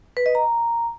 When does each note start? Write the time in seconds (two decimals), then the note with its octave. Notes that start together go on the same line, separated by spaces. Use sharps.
0.17 B4
0.26 D#5
0.35 A#5